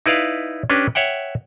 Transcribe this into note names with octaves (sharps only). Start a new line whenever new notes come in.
D#4 E4 B4 D5 F5
C#4 D4 G4 B4
C#5 E5 F#5 G5